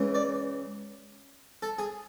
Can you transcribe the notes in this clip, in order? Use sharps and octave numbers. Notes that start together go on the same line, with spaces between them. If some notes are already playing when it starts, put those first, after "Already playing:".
Already playing: C#2 C#3 E3
D5
A4
G#4